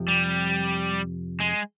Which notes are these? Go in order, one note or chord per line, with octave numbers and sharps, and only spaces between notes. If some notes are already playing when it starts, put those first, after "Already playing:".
Already playing: F2 C3 F3
G3
G#3